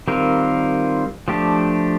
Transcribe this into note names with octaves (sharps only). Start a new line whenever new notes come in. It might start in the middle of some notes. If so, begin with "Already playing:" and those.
D#3 G3 C4 F4 A#4
F3 A3 D4 G4